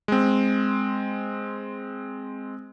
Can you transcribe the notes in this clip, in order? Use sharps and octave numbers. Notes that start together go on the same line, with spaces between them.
G#3 C4